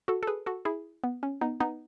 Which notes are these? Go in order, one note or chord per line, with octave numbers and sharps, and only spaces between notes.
F#4 A4
A4
G#4 B4
F#4 A4
E4 G#4
B3
C#4
B3 D#4
B3 D#4